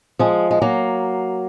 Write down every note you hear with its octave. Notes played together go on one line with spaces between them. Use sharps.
F3 G#3
G#3
F#3 A#3